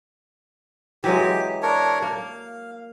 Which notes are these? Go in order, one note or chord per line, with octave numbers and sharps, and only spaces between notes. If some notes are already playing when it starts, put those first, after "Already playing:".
E3 F#3 G#3 G4
D4 A#4 C#5
A#3 F5